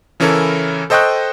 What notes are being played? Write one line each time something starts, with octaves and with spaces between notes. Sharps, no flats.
C#3 E3 C#4 E4 A4 A#4
A4 C5 D#5 G5 C#6 F#6